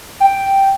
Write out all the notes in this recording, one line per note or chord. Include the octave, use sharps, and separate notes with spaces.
G5